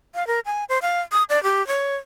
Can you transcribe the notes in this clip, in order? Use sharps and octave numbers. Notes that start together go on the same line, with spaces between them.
F5
A#4
G#5
C5
F5
D#6
D5
G4
C#5